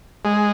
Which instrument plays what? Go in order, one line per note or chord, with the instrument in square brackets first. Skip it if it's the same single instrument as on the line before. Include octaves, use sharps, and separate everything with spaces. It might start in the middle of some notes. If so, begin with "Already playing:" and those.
[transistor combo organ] G#3